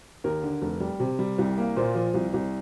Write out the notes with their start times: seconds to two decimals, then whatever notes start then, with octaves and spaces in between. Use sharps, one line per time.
0.24 D#2 A#4
0.43 D3
0.62 F1
0.80 G3
1.00 C3
1.19 G3
1.38 C2
1.58 A#3
1.76 A#2 C5
1.95 F3
2.14 C2
2.34 C2